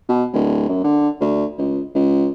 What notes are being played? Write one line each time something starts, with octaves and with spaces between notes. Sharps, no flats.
B2
D1
F#2
D3
D2
C#2
C#2